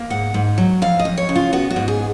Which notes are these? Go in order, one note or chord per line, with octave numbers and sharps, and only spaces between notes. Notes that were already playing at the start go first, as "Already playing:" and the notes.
Already playing: A#3
G#2 F#5
G#2
F#3
F2 F5
D#5
F2
C#5
C#3
F4
B3 F#4
F#4
G#2
G#4